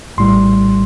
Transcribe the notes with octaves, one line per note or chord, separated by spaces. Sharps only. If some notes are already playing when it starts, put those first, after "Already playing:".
A#1 A2 G3 C6